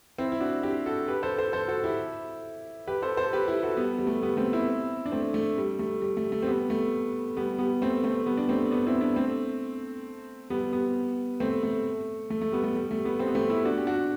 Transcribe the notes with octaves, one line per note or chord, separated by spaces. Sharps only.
C4 E4
E4
D4 F#4
E4 G4
F#4 A4
G4 B4
A4 C5
A4 C5
A4 C5
F#4 A4
E4 G4
G4 B4
A4 C5
A4 C5
G4 B4
E4 G4
F#4 A4
G3 B3
G3
A3
G3 B3
A3 C4
C4 E4
D4
A3 C4
A3
G3
A3
G3
A3
A3
C4
G3 B3
A3
G3 B3
G3 B3
A3 C4
A3 C4
G3 B3
D4
A3 C4
B3 D4
C4 E4
B3 D4
A3 C4
G3 B3
G3 B3
A3 C4
A3
A3
A3
G3 B3
A3
G3
A3
G3 B3
A3 C4
B3
A3 C4
E4 G4
D4 F#4
G4
D4 F#4